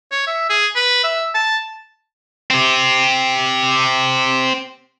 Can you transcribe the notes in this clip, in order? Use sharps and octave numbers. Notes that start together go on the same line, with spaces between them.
C#5
E5
G#4
B4
E5
A5
C4 G4